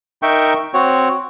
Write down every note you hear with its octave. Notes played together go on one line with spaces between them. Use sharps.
D#4 A#4 E5 G5 C#6
C4 F#4 C#5